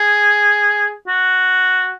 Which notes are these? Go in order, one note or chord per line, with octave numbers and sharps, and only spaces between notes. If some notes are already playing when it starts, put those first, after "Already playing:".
Already playing: G#4
F#4